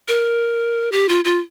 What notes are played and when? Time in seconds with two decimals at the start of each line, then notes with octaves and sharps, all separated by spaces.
0.08 A#4
0.92 G4
1.09 F4
1.25 F4